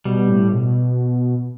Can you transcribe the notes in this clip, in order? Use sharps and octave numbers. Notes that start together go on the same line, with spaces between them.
B2 G3
A2
B2